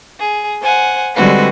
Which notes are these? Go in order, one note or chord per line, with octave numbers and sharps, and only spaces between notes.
G#4
C5 F#5 G#5
D3 G3 G#3 C4 F#4 B4